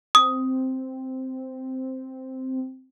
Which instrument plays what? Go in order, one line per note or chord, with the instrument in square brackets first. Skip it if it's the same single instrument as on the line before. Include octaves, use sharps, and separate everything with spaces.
[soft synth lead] C4 [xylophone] D#6